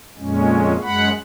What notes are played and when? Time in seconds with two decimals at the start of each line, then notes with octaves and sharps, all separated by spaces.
0.18 F2 A#2 G#3 C#4
0.82 F#2 G#3 F#5 B5